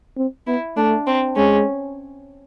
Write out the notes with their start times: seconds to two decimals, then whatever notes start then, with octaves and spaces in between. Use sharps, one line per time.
0.17 C4
0.47 B3 E4
0.77 A3 D4
1.07 C4
1.36 G#3 C#4